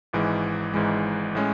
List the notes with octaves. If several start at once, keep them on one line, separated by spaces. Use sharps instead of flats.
G#1 G#2 E3 G#3
G#1 G#2 E3 G#3
A2 G#3 C#4